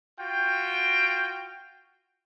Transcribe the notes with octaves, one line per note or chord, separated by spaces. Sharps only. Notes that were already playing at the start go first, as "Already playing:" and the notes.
F4 F#4 G5